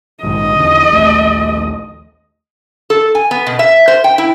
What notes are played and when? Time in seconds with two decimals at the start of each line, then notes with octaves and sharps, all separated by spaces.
0.23 A#1 G#2 D#3 D#5
0.55 E2 D3
0.92 A#1 D#2 A3
2.90 A4
3.15 G#5
3.31 B3
3.47 B2
3.59 E5
3.88 C5
4.04 G5
4.18 E4